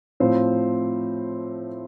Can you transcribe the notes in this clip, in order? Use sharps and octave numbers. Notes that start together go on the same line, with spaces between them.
A2 F3 C4 F4 C5